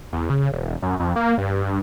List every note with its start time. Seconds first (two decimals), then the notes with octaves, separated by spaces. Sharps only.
0.13 E2
0.30 C#3
0.52 E1
0.82 F#2
1.00 F2
1.16 A#3
1.38 G2
1.64 G2